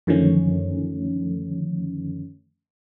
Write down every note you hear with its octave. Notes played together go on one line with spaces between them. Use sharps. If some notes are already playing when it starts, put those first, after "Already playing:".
F#2 D3 D#3 F3 A3 C#4